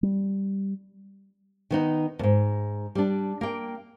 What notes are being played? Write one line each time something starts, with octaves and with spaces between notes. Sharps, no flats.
G3
D#3 B3 D#4
E2 G#2
G3 D4
A#3 G5